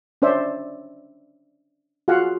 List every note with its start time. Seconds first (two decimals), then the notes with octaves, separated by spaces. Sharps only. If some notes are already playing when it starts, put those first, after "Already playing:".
0.22 C#4 D4 C5 D5 E5
2.08 F4 F#4 G#4 F5 F#5